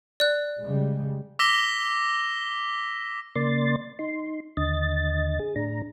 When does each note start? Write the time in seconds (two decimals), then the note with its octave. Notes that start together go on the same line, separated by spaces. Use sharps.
0.20 D5 F#6
0.63 C#3 G3 G#3
1.39 D6 E6 A#6 B6 E7 G7
3.36 C#3 A#3 D5 C6 A6
3.99 D#4 C6
4.57 D#2 D3 D#5 A6
5.40 G#4
5.56 A2 D4 A#5